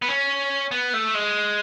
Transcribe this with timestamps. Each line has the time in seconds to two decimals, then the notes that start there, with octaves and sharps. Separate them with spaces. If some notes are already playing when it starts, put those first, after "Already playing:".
0.02 B3
0.08 C#4
0.71 B3
0.94 A3
1.14 G#3